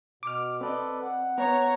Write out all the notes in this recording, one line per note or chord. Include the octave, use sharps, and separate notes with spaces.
B2 D6 F6
C4 A4 B4 D5 D#5 D6
F#5
B3 C#5 A#5